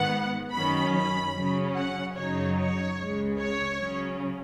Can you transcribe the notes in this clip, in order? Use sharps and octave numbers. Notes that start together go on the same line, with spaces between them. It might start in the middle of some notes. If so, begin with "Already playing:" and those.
Already playing: G#2 D#3 B3 F#5
F#2 D#3 F#3 C#4 B5
B5
C#3 F#3 C#4
F#5
F#2 C#3 F#3 D#4 C#5
C#5
C#2 C#3 G#3
C#5
C#3 F#3 C#4